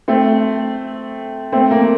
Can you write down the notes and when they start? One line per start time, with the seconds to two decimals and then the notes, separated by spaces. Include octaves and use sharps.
0.08 A3 C4
1.52 A3 C4
1.71 A#3